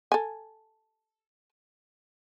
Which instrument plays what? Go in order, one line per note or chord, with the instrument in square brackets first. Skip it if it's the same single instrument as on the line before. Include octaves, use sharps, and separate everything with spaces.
[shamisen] A4 G#5